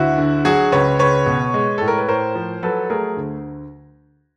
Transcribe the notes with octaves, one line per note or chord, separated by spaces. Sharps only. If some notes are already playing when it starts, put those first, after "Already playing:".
Already playing: D2 E4 F#4
D3
F#3 F#4 G#4
C#2 B4 C#5
C#2 B4 C#5
B2
G#3
A2 A4
A#4
B4
A2 A#4 C5
F3
F#3 A4 B4
A3 G#4 A#4
D2